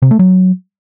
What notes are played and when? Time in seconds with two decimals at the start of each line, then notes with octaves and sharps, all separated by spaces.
0.02 C3
0.11 A3
0.19 F#3